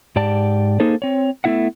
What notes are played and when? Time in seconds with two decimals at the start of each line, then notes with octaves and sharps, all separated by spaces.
0.16 G#2 G4 D5 A5
0.80 A#3 D#4 G#4 A4 C5
1.02 C4 C#5
1.44 A3 B3 E4 E5 F#5